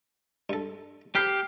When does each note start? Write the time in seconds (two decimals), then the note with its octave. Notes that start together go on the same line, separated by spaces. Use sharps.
0.50 G2 A4
1.15 G4 B5 D6 F6 G6 C7